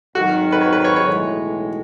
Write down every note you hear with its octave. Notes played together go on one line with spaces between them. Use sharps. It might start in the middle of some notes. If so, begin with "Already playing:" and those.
G#1 G#2 D#3 F#3 F#4
B4
C#5
B4
C#5
C#5
B1 A2 E3 G#3